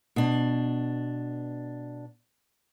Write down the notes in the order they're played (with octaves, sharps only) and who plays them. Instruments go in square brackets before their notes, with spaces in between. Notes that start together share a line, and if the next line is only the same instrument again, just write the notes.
[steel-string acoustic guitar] B2 D4